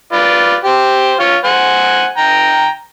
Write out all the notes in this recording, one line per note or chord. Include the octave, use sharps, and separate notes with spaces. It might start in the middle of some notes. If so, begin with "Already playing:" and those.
F4 B4 D5
G4 C5
F4 C#5 F5
C5 F#5 G#5
G5 A#5